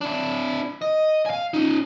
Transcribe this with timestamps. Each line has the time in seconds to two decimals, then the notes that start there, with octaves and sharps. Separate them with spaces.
0.01 D4 E4
0.82 D#5
1.26 F5 G#5
1.54 C#4 D#4